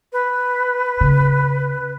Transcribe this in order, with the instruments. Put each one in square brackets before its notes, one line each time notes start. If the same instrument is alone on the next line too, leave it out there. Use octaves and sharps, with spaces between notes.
[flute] B4
[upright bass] C#3